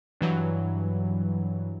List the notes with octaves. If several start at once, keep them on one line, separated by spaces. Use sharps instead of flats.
G2 E3 F#3